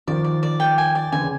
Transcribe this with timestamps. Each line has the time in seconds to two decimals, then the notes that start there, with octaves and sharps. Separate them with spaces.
0.07 D#3 F3 D5
0.24 D5
0.43 D5
0.60 G5
0.78 G#5
0.95 D5
1.12 D3 E3 G#5
1.21 C#3